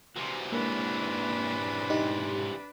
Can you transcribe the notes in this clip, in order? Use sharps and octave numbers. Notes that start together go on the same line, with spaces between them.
C3 E3 F#4 C5
G#2 A#3 D4 E4 B4
D#4 G4